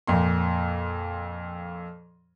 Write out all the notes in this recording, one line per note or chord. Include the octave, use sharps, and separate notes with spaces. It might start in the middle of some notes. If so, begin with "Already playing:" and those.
F2 A#2 C6